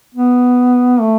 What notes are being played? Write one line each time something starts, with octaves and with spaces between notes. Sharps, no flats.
B3
A3